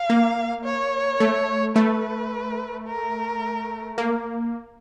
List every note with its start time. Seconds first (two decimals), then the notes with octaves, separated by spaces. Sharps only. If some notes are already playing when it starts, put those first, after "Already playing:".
Already playing: F5
0.10 A#3
0.65 C#5
1.20 A3
1.76 A3 B4
2.86 A#4
3.98 A#3